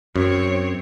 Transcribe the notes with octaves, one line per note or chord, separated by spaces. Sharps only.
F#2 C4 C#5